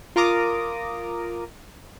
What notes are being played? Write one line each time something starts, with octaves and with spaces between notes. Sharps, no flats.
F4 A#4 A#5 D6 D#6